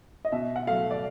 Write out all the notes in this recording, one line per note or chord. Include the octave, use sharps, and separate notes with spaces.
D#5
B2 E5
F#5
F#3 A3 F5
D5